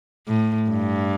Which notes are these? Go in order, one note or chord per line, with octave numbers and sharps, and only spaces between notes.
A2
G2